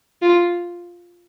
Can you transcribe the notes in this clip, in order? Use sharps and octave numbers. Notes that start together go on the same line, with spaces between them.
F4